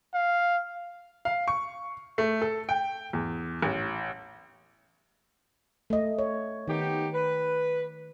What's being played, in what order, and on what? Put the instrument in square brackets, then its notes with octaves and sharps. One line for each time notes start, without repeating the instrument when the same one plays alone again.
[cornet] F5
[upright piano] F5
C#6
A3
A4
G5
E2
A1
[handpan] A3 D#5
C#5
[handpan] D#3 [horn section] B3 D#4 G4
[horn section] B4